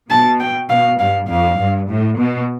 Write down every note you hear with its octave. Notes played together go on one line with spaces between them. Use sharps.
B2 A5
G5
B2 F5
G2 F5
F2 F5
G2
A2
B2